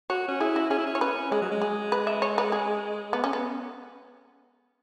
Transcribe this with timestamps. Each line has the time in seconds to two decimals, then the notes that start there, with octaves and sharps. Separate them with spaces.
0.10 F#4 C#5
0.29 C#4
0.40 E4 G#4
0.56 F#4
0.70 C#4 G#4
0.78 E4
0.87 C#4
0.95 C#5
1.01 C#4 B4
1.31 G#3 G#4
1.42 F#3
1.52 G#3
1.62 G#4
1.92 B4
2.07 E5
2.22 C#5
2.38 B4
2.52 G#4
3.13 B3
3.24 C#4
3.33 B3